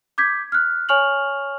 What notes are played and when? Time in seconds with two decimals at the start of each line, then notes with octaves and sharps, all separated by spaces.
0.18 D6 G6 G#6 B6
0.52 F6 F#6
0.89 C#5 G#5 C#6 F6 F7 F#7